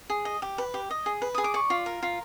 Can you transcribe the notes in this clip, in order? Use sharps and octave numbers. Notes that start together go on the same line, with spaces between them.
G#4
D#5
G4
B4
G4
D#5
G#4
B4
G#4 D#6
D6
D5 C#6
F4
A#4
F4